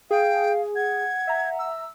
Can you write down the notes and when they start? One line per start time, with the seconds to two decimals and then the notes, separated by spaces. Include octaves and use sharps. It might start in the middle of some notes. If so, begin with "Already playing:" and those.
0.11 G#4 F5 G5
0.76 F#5 G#6
1.27 E5 A#5
1.59 E6